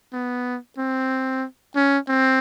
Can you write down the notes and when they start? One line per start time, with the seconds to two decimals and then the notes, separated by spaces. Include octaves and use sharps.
0.12 B3
0.78 C4
1.75 C#4
2.08 C4